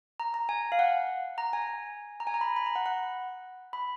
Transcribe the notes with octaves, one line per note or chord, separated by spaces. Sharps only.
A#5
A#5
G#5
F5
F#5
A#5
G#5
A#5
G#5
A#5
B5
B5
A#5
F#5
F#5
B5